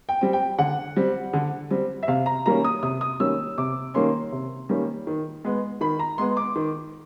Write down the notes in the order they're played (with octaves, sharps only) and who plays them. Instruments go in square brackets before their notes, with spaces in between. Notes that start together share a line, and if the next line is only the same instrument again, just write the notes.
[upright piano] G5
G3 C4
G5
D3 F#5
G3 C4
D3
G3 C4
E5
C3 F5
A#5
D#3 G3 A#3 C#4 A#5
D#6
C3 D#6
D#6
D#3 G3 A#3 C#4 E6
C3 D6
D#3 G3 A#3 C#4 C6
C3
D#3 G3 A#3 C#4
D#3
G#3 B3
D#3 B5
A#5
G#3 B3 C6
D6
D#3